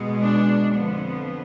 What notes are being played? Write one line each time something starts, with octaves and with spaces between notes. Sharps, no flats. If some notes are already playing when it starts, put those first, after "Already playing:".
Already playing: B2 G#3 B3
D4
F2 D3 F3 B3